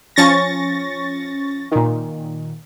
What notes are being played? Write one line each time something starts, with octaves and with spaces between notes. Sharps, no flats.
F3 C#4 C#6 A6 A#6
A#2 D#3